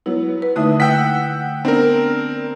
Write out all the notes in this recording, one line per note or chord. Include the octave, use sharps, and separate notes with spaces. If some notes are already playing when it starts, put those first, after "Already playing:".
F#3 B3 E4
B4
D#2 D3 A3 E4 D#6
F#5 G5 E6 B6
B3 C4 D4 A#4